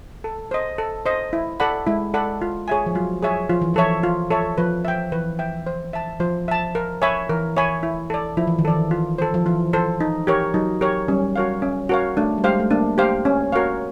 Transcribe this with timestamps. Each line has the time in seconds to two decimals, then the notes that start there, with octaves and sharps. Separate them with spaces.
0.24 A4
0.51 C5 D#5
0.78 A4
1.06 C5 D#5
1.33 E4
1.60 A4 D5 F#5 B5
1.87 G#3 E4
2.14 A4 D5 F#5 B5
2.41 F4
2.68 G#4 C#5 E5 G#5
2.86 F3
2.95 F#3 F4
3.23 G#4 C#5 E5 G#5
3.49 F3 F4
3.62 E3
3.74 F3 A4 C#5 E5
4.03 F4
4.31 A4 C#5 E5
4.58 F3 B4
4.85 E5 G5
5.12 E3 B4
5.39 E5 G5
5.67 C5
5.93 E5 A5
6.20 F3 C5
6.48 E5 A5
6.75 A#4
7.02 C#5 E5 G#5 B5
7.29 E3 A#4
7.57 C#5 E5 G#5 B5
7.83 E4
8.10 A4 D5
8.37 F3 E4
8.47 E3
8.59 D#3
8.65 E3 A4 D5
8.91 F4
9.18 A4 C5
9.34 F3
9.46 E3 F4
9.73 A4 C5
10.00 D#4
10.27 G4 A#4 C#5
10.54 F#3 D#4
10.81 G4 A#4 C#5
11.08 G3 C#4
11.36 F#4 A#4 C#5 F5
11.62 C#4
11.89 F#4 A#4 C#5 F5
12.17 A3 D4
12.38 G3
12.44 G#3 G4 C5 F5
12.60 A3
12.71 A#3 D4
12.98 G4 C5 F5
13.25 C#4
13.52 F#4 A#4 C#5 F5